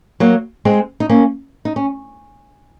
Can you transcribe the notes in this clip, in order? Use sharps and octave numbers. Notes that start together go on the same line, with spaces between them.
F#3 A#3
G#3 C4
D#4
A#3 C#4
D#4
C#4